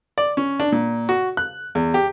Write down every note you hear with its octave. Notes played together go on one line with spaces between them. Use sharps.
D5
C#4
D4
A#2
F#4
F#6
E2
G4